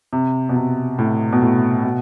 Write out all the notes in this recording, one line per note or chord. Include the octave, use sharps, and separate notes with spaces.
C3
B2
C3
A2
B2
A2
B2